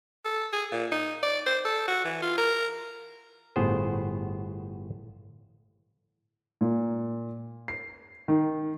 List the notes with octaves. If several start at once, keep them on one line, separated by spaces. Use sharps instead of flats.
A4
G#4
A#2
D#4
D5
C5
A4
F#4
E3
F4
A#4
G1 A2 B3 G#4 C5
A#2
C7
D#3